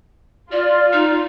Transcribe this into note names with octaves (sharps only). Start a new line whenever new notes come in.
F4 D5
D#4